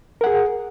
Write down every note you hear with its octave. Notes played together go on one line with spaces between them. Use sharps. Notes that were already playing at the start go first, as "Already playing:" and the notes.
G#4 A#4 F#5